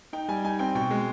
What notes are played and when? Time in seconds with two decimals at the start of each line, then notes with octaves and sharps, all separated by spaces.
0.13 D#4 G5
0.28 G3 G#5
0.44 D#4 G#5
0.59 C4 G5
0.75 B2 G5
0.91 G#3